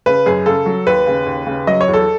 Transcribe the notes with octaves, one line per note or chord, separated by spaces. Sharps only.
C#3 B4
F#2 G#4
C#3 A4
F#3
D#2 B4
C#3
D#2
C#3
F#3 D#5
C#5
E2
A4